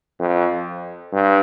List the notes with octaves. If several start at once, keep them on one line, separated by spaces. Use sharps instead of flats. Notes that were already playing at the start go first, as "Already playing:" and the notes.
F2
G2